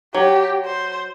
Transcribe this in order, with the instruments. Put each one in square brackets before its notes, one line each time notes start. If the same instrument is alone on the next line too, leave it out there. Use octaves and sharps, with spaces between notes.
[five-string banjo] F#3 [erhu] G4
[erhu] C5